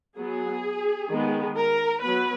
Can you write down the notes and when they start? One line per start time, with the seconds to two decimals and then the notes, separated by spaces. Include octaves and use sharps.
0.18 F#3 B3 G#4
1.11 D#3 G#3 B3
1.56 A#4
2.02 F#3 B3 B4